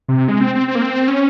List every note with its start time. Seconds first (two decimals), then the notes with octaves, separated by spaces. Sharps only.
0.08 C3
0.28 G#3
0.41 C4
0.55 C4
0.68 C4
0.75 A#3
0.82 C4
1.08 C#4